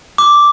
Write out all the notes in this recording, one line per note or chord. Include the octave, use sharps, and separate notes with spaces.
D6